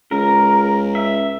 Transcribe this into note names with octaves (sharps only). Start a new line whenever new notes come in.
C#2 A#4
E5